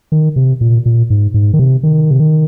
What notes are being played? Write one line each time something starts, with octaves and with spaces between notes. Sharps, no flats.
D#3
C3
A#2
A#2
G#2
G#2
D#3
C3
D#3
C3
D#3